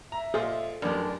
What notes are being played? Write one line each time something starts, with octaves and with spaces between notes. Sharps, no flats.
E5 A#5
A#2 G#4 A4 C5 D#5 F5
A1 F#2 D4 G4 A#4 D5